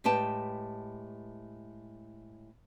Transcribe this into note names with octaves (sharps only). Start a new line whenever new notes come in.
A2 G#3 G4 B4 G5 A5